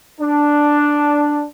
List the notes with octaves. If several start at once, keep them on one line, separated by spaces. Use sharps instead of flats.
D4